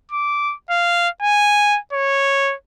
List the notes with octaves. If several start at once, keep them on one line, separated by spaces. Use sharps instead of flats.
D6
F5
G#5
C#5